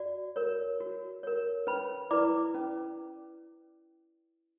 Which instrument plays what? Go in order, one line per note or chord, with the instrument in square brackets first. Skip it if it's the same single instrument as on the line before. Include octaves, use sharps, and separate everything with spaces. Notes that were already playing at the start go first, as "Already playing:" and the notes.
Already playing: [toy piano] F#4 D5
A#4 C#5
F#4
A#4 C#5
C#4 B4 B5
E4 B4 D5 D6
C#4